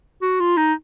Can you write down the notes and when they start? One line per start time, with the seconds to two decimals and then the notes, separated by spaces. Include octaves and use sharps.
0.22 F#4
0.40 F4
0.57 D#4